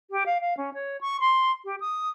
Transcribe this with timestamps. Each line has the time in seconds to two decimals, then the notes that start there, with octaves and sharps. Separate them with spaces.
0.11 G4
0.26 F5
0.41 F5
0.57 C#4
0.74 C#5
1.01 C#6
1.20 C6
1.65 G4
1.81 D#6